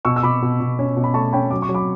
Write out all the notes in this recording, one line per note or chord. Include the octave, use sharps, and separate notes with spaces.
B2 C#6 E6
E6
B2 B5 D6
B2
B2
C#4
B2
B5
A3 A5 C#6
C#4 G5 B5
F#3 D6
C#6
F#3
B5 D6